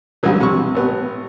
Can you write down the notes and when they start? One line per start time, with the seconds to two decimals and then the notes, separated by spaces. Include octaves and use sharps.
0.23 C2 G2 C#3 E3 F#3
0.40 C3 C#6
0.75 A1 B3